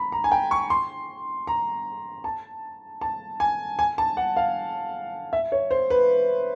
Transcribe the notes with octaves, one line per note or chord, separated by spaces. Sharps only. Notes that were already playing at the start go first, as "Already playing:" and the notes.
Already playing: A#5 B5
A#5
G#5
G5
C#6
C6
A#5
A5
A5
G#5
G#5
A5
F#5
F5
E5
C#5
C5
B4